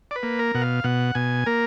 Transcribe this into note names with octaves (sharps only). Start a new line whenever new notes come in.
D5
B4
A#3
A#4
B2 F#5
F5
B2 F#5
B2 G#5
A#3 A#4